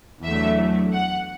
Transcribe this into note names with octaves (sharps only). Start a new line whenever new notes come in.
E2 D3 F#3 A3 E5
F#5